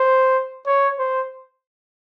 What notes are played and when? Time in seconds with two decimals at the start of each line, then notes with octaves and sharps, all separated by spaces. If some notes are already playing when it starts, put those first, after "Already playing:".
Already playing: C5
0.66 C#5
0.99 C5